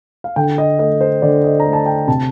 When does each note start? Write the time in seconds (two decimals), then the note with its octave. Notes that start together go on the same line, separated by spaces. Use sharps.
0.24 F5
0.36 D3 G5
0.58 D#5
0.79 A3 D#5
1.01 C5
1.22 D3 D5
1.44 D#5
1.60 A#5
1.65 A3
1.73 A5
1.86 G5
2.07 C3 A5